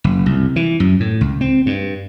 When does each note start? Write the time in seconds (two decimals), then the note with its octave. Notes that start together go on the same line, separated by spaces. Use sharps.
0.04 F#1
0.26 C2
0.56 E3
0.80 F#2
1.00 A2
1.21 C#2
1.41 C4
1.66 G2